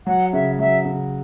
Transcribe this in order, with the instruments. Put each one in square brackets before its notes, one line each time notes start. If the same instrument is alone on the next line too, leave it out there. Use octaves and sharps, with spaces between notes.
[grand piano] F#3 [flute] F#5
[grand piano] C#3 [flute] E5
[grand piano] F#3 [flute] E5
[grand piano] C#3